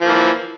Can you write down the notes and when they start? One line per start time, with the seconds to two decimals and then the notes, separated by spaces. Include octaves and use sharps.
0.01 F3
0.05 A#3
0.08 E3